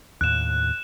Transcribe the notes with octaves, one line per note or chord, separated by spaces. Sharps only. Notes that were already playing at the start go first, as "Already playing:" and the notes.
D#2 A2 F#6 E7